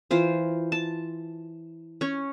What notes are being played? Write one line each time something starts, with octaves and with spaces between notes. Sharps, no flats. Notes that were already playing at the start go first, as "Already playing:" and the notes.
E3 F4 C5
A5
C#4 C#5